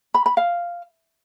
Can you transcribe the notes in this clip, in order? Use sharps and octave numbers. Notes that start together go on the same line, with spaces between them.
B5
B5
F5